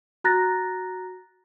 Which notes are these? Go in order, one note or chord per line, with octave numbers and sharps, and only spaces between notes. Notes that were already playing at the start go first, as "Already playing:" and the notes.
F#4 A#5 F#6 A6 A#6